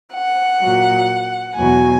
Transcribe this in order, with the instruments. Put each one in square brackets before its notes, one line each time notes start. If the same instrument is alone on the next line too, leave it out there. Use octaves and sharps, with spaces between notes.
[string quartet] F#5
A#2 F#3
E2 B2 F#3 G#5